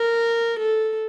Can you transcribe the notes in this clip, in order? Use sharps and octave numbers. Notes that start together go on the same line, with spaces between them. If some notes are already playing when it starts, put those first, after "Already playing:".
Already playing: A#4
A4